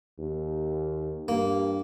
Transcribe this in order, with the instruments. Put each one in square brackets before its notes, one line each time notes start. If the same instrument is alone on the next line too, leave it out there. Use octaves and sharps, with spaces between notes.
[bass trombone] D#2
[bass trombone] G2 [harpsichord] A#3